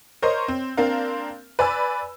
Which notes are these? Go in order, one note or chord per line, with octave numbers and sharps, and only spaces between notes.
A#4 C5 C#5 D#5 C6
C4
A#3 C4 D4 A#4 F5
B4 D5 G#5 B5 E6